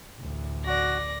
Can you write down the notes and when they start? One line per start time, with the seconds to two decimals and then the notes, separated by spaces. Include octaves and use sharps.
0.18 A1 D2
0.66 F#4 D5 A#6